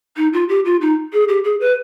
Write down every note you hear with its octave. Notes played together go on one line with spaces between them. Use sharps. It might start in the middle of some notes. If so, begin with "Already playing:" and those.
D#4
F4
G4
F4
D#4
G#4
G4
G#4
B4